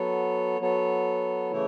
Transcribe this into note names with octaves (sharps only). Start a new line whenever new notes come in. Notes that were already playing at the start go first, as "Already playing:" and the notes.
Already playing: F#3 B3 A4 C#5
F#3 B3 A4 C#5
C#3 E3 A3 E4 C#5